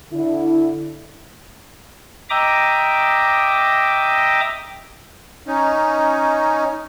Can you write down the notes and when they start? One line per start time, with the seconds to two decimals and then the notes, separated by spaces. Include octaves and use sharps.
0.13 D3 E4
2.30 D#5 E5 G5 A#5 D6 D#6
5.47 C#4 D#4